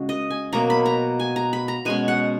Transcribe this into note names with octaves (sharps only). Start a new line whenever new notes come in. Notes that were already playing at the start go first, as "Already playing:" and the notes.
Already playing: C#3 G#3 C#4 F#4
D#5
G#5
B2 F#3 A#3 A#5
B5
A#5
G#5
A#5
B5
A#5
B2 G#3 C#4 G#5
F#5